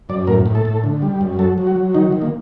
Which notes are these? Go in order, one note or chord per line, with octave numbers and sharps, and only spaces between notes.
F#2 D5
A2 A#4
A2
A4
A2
D3
G3
F#2
F#3 A4
F#3
F#4
F#3
D#3 D#4
D#3
A#3